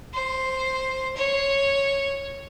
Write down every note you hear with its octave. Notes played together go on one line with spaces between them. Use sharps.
C5
C#5